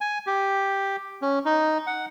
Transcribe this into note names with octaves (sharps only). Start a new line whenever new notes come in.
G#5
G4
C#4
D#4
F#5